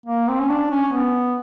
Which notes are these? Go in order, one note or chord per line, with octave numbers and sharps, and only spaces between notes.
A#3
C4
C#4
D4
C#4
B3